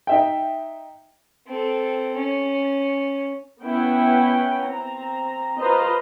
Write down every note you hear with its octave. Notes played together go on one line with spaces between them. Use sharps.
D#4 E5 G5
C4 A4
C#4
B3 C#4 E4 B4 F#5 G5
C4 A#5
F4 B4 C5 D#5 A#5